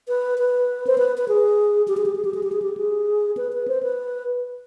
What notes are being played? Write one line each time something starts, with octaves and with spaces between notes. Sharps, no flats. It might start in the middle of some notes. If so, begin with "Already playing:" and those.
B4
B4
C5
B4
B4
G#4
G4
G#4
G4
G#4
G4
G#4
G4
G#4
G4
G#4
B4
B4
C5
B4